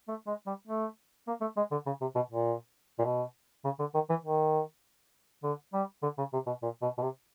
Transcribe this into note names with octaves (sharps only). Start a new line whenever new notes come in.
A3
G#3
G3
A3
A#3
A3
G#3
D3
C#3
C3
B2
A#2
A#2
B2
C#3
D3
D#3
E3
D#3
D3
G3
D3
C#3
C3
B2
A#2
B2
B2
C3